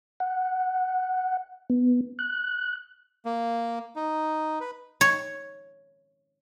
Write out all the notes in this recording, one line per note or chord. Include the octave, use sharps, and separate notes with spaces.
F#5
B3
F#6
A#3
D#4
B4
C#5